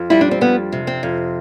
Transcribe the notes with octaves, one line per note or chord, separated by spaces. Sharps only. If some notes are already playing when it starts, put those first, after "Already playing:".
Already playing: F2
G3 E4
D4
C4
F2 B3
C3
C4
F2